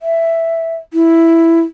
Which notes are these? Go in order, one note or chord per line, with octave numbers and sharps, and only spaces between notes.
E5
E4